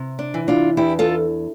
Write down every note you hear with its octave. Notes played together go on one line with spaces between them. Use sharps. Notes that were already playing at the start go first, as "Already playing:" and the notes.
Already playing: C3
D4
E3
D4 F4
E2 E4 G4
F4 A4